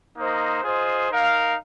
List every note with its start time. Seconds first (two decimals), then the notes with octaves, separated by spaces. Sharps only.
0.18 A#3 D#4 C5 D#5
0.63 F4 G#4 C5 D#5
1.10 D#4 A#4 F5